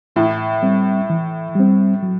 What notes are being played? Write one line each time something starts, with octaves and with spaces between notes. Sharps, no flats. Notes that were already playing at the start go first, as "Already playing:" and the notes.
A2 E3
G3 C4
E3
G3 C4
F#3